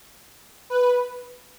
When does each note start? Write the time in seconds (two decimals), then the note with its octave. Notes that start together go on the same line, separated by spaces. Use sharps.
0.70 B4